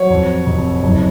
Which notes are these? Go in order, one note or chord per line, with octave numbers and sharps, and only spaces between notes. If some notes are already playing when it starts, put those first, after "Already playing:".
Already playing: F#3 C#5
F2
F1
F#1